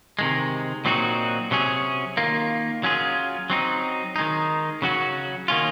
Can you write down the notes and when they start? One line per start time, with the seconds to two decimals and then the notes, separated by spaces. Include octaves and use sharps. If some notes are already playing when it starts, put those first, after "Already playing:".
0.19 C3 D#3 G#3
0.85 A#2 F#3 C4 D#4 F#4
1.51 C3 F#3 C#4 G#4
2.17 D#3 A#3 F4
2.83 F#3 C#4 F4 G#4
3.50 F#3 C4 D#4
4.16 D#3 G#3 D#4
4.82 C#3 F#3 C#4 F#4
5.48 D#3 A#3 C#4 F4